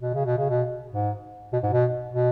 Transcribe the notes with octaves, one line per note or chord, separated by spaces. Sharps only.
B2
C#3
B2
C#3
B2
G#2
B2
G#2
B2
B2